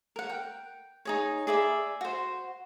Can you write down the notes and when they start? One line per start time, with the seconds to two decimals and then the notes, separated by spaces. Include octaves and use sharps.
0.16 A#4 F#5
0.29 G5
1.05 D#4 G#4 C#5
1.47 G#4 D5 E5 B5
2.01 F#4 C5